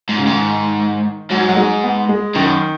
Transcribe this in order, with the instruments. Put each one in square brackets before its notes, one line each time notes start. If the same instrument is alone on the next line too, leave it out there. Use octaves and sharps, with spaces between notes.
[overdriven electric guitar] G#2
[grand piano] C#3
[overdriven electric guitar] G#2 [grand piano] D#3
[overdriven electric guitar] G#2 [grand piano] F#3
[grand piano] F#3
G#3
B3
G#3
[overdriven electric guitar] F#2 [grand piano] D#3